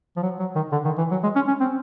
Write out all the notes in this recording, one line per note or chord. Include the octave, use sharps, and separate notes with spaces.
F3
F#3
F#3
D#3
D3
D#3
E3
F#3
G#3
C#4
C#4
C4